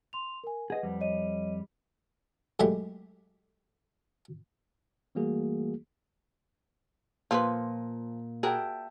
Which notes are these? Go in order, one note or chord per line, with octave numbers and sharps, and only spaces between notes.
C6 F7
A#4 G#5
G#4 B4 D#5 F#5
F2 G3
C#5 D#5 D#7
F#2 D3 G#3 A3 G4 B5
E3 G3 A3 A#3 F#4 G#4
A#2 F3 A4 B4
F#4 G#4 A#4 E5 G5 A5